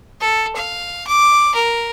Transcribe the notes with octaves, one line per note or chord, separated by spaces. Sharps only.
A4
F5
D6
A#4